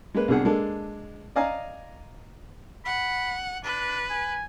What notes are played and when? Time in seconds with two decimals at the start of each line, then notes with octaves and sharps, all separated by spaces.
0.14 G#3 A#3 B4
0.28 C2 B2 D4 G#4 F#5
0.45 G#3 A#3 D4 A4
1.36 D5 D#5 F5 G#5 A#5
2.85 F#5 B5
3.64 D4 B4
4.10 G#5